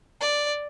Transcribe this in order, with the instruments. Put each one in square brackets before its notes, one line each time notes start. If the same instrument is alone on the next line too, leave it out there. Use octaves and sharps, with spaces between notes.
[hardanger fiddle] D5